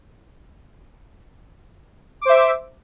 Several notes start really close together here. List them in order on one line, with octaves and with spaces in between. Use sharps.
D6 C5 E5